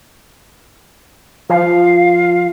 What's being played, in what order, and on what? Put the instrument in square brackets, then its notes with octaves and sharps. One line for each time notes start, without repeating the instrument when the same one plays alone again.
[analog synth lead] F3 [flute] F5